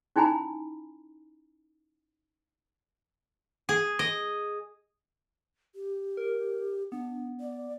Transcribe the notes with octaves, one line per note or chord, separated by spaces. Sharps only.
C#4 D#4 E4 G#5 A#5 B5
G#4
D#5
G4
A#4
B3 D4
D5